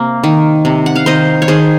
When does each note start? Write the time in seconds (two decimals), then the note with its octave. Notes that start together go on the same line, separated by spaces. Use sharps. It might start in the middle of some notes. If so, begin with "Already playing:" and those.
Already playing: C3 A#3
0.24 D#3
0.65 C3
0.86 F#5
0.96 F5
1.06 D#3 C5 D#5
1.42 C#5
1.48 D#3 G#4 C5